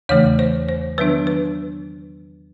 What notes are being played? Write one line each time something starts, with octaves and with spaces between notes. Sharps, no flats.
E2 C#3 E3 A3 C#5
C5
C5
D#3 F#3 B3 D4 B4
B4